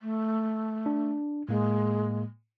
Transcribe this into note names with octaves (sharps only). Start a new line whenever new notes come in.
A3
D4
A2 G#3 A#3